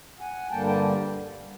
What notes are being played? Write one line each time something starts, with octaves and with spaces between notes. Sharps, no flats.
F#5 G#5
G2 D3 G3 A#3 G5 A5
G5 A5